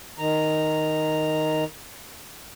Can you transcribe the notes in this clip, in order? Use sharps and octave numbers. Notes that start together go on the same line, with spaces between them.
D#3 A#5